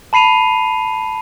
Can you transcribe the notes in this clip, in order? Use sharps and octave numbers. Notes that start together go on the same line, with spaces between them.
A5 B5 C7 D#7 F7